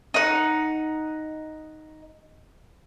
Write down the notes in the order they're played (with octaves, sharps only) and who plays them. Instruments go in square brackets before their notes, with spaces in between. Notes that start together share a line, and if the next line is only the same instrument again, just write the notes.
[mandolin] D#4 F#5